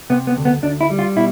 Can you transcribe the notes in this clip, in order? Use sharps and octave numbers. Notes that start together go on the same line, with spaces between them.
C3 B3
B3
D2
B3
D2 D4
E4
G3
F4
B2 E4